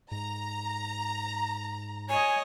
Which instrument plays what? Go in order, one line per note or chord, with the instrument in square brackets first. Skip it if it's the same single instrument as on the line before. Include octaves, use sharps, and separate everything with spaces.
[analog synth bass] G#2 [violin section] A#5
[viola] C#5 D#5 [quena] G#5